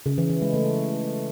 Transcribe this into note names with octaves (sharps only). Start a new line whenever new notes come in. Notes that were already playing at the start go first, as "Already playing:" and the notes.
C#3
E3
E3
G#3
A3